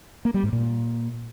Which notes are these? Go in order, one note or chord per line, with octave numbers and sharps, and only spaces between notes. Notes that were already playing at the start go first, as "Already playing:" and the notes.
A#3
G3
G#2
A#2